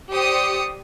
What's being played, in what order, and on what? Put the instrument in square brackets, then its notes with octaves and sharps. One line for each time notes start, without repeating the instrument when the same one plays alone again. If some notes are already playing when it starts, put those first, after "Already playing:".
[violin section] G4 C5 D5 D#6 C#7